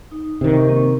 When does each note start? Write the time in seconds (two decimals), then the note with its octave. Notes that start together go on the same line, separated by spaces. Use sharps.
0.11 D#4
0.41 C3 D#3 C5
0.56 C#6
0.69 A#3 C4